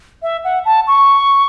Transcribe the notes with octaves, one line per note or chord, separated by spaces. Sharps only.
E5
F#5
A5
C#6